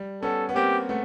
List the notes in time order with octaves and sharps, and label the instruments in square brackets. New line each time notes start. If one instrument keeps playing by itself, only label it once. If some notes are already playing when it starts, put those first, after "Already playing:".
Already playing: [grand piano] G3
[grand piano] B3 C#4 [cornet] A4
[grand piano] B3
[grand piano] A#3 C4 [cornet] G4
[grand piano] A3 B3